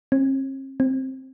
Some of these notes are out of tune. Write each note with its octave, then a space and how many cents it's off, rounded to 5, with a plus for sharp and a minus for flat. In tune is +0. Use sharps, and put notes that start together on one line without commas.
C4 +45
C4 +10